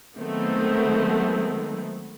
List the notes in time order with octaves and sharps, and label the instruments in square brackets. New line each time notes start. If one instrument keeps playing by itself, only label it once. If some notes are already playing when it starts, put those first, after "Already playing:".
[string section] D#3 F#3 G#3 A3 B3 C4